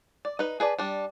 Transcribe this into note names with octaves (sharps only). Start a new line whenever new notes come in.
D5
D#4 B4
G#4 B4 D5 A5
G3 D4